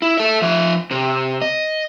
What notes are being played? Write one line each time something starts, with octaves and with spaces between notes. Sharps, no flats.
E4
A4 E5
F3 E5
C3
D#5